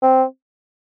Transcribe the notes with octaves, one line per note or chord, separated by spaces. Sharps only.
C4